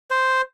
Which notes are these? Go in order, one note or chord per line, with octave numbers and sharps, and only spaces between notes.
C5